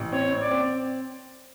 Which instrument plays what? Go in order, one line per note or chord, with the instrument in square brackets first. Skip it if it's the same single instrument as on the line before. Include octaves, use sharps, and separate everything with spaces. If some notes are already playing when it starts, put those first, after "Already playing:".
Already playing: [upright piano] A1
[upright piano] C4 [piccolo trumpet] C#5
[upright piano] C4
[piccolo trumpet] D5
[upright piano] C4